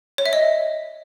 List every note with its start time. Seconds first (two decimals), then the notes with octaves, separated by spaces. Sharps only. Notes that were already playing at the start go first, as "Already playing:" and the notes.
0.18 C#5
0.26 E5
0.33 D#5